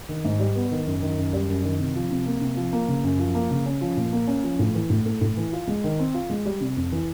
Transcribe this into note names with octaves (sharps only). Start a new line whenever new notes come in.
D#3
G#2
G3
B3
D#3
F#2
D#3
F#2
G3
F#2
D#3
C3
F3
C3
A#3
C3
F3
A#3
C#3
F#2
F3
A#3
C#3
C#4
F3
A#2
A#3
C#4
F3
A2
E3
A2
A3
A2
E3
F4
G#3
D#3
C4
F4
G#3
G3
C3
F2
E3